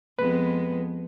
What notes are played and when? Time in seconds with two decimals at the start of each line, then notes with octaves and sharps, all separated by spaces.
0.19 F2 G#3 B3 B4